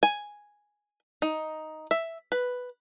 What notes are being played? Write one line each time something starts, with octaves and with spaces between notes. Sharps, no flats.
G#5
D#4
E5
B4